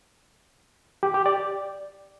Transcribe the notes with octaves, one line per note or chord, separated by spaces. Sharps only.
G4
G4
D5